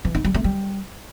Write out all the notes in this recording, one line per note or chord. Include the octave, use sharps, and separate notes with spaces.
E3
D#4
G3
A3
G3